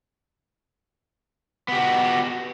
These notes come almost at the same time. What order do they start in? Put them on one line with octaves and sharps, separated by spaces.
B3 G4 F#4